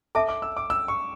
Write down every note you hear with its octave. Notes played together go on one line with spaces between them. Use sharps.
A4 E5 A5 D6
D6
E6
D6
E6
C#6